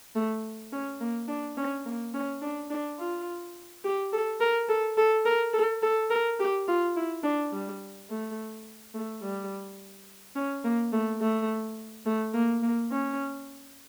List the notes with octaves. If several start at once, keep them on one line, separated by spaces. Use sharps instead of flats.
A3
C#4
A#3
D4
C#4
A#3
C#4
D4
D4
F4
G4
A4
A#4
A4
A4
A#4
A4
A4
A#4
G4
F4
E4
D4
G3
A3
A3
G3
C#4
A#3
A3
A3
A3
A#3
A#3
C#4